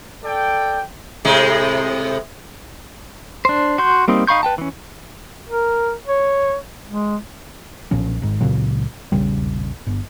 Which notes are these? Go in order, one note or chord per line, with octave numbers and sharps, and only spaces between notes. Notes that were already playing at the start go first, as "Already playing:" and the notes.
A4 D5 G5
A2 C3 G#3
D4 C5
F#4 C6 G6
G3 A#3 C4 D#4
D#4 F5 B5 C#6 G6
B4 G5 A5
E3 C#4
A#4
C#5
G#3
B1 A#2 F3 C#4
G#1 G#2
C#2 A#2 C#3 F#3
E1 A#1 C#3 G3
G1